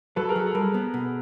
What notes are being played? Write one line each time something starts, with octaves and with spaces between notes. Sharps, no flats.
F#3 A4 B4
G#4 A#4
F#3
A4
G3 G#4 A#4
B3
B2